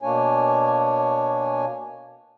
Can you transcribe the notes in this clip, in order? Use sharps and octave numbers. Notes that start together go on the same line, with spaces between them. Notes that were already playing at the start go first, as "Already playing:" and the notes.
B2 A#3 D4 C#5 G#5